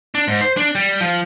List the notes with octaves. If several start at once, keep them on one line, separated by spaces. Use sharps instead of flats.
D4
G#2
C5
D4
G3
F3